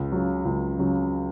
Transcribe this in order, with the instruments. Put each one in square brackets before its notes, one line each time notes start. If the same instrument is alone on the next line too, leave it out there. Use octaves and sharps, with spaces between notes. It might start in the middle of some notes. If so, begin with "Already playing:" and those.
Already playing: [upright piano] C#2
C#3 F#3
C#2
C#3 F#3